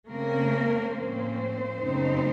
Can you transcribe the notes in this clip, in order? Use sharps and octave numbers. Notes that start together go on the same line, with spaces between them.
C#3 A3 A#3 C4 A#4
A2 F3 A#3 C4 C#4 C5
F#2 C#3 A3 C4 D#4